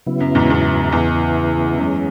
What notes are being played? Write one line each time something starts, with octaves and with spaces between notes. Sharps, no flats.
C#3 F#3 B3 E4
F#2
E2 G#2
E2
E2 C#3 E3 B3 E4
F#2 E3 G#3 C#4